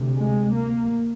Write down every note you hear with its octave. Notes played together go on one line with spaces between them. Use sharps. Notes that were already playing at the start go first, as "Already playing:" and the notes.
Already playing: D2 C3
G#3
A#3